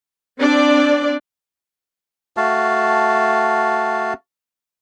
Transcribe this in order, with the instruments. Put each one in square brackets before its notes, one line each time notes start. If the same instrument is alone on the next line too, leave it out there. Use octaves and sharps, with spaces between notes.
[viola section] C4 D4 D5
[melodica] A3 F#4 F5 A5